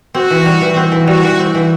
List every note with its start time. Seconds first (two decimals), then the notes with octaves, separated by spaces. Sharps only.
0.14 C4 F#4
0.31 E3
0.46 G3
0.61 E3
0.76 C4
0.92 E3
1.07 G3 F#4
1.23 E3
1.39 C4
1.55 E3